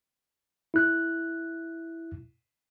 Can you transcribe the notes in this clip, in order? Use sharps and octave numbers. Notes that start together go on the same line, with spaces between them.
E4 F#6